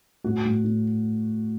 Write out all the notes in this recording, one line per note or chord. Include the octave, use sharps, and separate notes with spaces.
A2 F#4
A2
A2